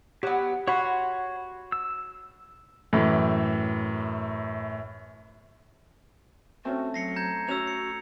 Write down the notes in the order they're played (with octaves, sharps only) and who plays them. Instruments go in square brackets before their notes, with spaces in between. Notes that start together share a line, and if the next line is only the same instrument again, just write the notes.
[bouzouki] F#3 B3 [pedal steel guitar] G4
[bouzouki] F#4 [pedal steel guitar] C#5 B5 C6
[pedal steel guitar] E6
[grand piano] F#2 A2 E3
[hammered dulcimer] A3 [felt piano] C4 C#4 [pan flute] F#4
[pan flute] F#3 [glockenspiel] A#6 C7 C#7
[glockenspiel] A#5 G6 G#6
[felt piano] C#4 [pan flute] F#4 [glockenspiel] E6 F7
[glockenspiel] C#7